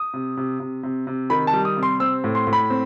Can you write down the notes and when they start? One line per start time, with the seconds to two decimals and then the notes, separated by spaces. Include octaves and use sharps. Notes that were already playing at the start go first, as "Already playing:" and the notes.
Already playing: D#6
0.14 C3
0.37 C3
0.60 C3
0.83 C3
1.07 C3
1.30 D#3 B5
1.47 A5
1.53 G3
1.65 D#6
1.77 C3
1.83 C6
2.00 C4 E6
2.24 A2
2.35 C6
2.47 A2
2.53 B5
2.70 C4